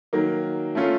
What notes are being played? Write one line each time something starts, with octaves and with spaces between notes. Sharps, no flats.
D#3 F#3 A#3
A3 C#4 F4